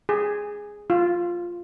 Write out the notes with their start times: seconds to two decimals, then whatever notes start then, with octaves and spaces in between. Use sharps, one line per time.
0.09 G#4
0.90 F4